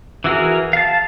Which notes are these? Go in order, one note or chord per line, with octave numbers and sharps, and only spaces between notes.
E3 E4 F#4 G#4 A#4
F5 A5